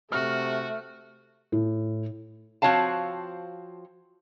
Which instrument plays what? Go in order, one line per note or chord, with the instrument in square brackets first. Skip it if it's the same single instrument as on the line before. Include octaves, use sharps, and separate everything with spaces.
[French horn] C3 [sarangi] A3 [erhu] F#4 [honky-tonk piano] F6
[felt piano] A2
[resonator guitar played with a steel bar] F3 C4 F#4 C#5 F5 A5